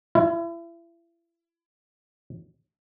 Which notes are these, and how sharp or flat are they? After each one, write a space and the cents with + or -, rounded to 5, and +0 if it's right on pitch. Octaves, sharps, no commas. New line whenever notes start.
E4 +35